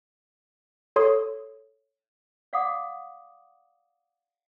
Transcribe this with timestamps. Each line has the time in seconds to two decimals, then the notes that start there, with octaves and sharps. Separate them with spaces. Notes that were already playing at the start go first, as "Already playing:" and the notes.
0.96 A4 C#5 C6 D#6
2.53 D5 F5 F#5 D6 D#6